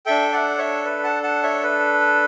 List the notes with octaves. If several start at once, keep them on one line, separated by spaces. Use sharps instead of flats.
D4 A4 E5 G5
D5 F#5
C#5 E5
B4
F#5 A5
F#5 A5
C#5 E5
B4